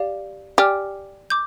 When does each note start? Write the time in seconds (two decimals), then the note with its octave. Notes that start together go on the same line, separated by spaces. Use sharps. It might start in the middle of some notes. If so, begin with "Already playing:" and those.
Already playing: G4 D5 F5
0.58 G4 D5 G#5 D6 F6
1.30 D6 G6